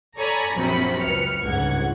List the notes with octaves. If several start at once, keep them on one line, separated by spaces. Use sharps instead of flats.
A4 C#5 D5 G#5 A#5 B5
A#1 F#2 C3 C4 B5
C#2 B4 F6 C#7
G1 C#2 G#2 F#5 G#6